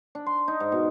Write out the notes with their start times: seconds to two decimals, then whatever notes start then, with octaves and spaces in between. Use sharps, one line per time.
0.15 D4
0.26 C6
0.48 D#4
0.60 G#2
0.72 B2